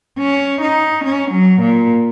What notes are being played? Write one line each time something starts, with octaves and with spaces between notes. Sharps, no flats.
C#4
D#4
C#4
F#3
A#2